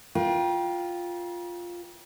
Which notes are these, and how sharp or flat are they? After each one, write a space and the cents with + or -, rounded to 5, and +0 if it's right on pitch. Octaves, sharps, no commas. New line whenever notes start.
F4 +0 A#4 +45 G5 +0